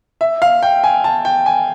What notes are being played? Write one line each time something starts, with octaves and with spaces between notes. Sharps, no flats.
E5
F5
G5
G#5
A5
G5
G#5